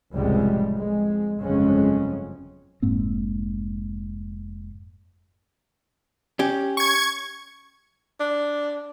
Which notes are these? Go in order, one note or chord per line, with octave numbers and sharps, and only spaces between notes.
F1 C#2 A2 C3 G3 G#3
F2 G#3
G1 F2 C#3 F#3 G#3 C#4
F1 G#2 A#3 C4
C#4 G4
C#6 G#6
D4